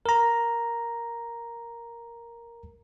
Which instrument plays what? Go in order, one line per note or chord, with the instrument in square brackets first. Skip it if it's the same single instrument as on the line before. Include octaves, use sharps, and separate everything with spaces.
[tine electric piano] A#4 A#5